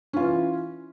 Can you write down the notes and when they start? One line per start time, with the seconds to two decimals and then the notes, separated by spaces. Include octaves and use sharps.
0.13 C#4
0.17 F4
0.20 E3